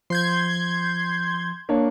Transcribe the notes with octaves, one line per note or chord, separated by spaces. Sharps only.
F3 C6 G6 G#6
A#3 D4 C#5